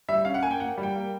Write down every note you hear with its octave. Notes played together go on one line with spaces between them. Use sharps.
G3 E5
C#4 F5
F#5
A#3 G#5
G5
A#3 F#5
G3
G5
A#3